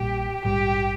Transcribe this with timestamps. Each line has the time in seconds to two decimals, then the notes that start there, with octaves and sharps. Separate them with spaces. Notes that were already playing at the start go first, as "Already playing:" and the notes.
Already playing: A#1 A#2 G3 G4
0.44 A#1 G#2 G3 G4